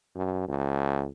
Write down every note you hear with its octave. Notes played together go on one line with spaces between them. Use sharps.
F#2
C#2